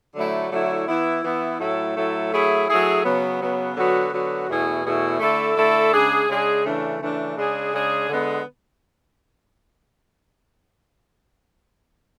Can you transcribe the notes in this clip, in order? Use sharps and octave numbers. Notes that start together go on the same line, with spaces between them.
D3 F#3 A3 E4
D3 F#3 A3 E4
E3 B3 E4
E3 B3 E4
A2 F#3 A3 E4 A4
A2 F#3 A3 E4 A4
F#3 A3 E4 G#4
F#3 A3 E4 G#4
C#3 F#3 B3
C#3 F#3 B3
D3 F#3 B3 F#4
D3 F#3 B3 F#4
E2 B2 A3 E4 G#4
E2 B2 A3 E4 G#4
D3 A3 E4 A4
D3 A3 E4 A4
C#3 G#3 D4 G#4
C#3 G#3 D4 G#4
C#3 E3 A3 D4
C#3 E3 A3 D4
C#3 G#3 D4 G#4
C#3 G#3 D4 G#4
D3 G#3 B3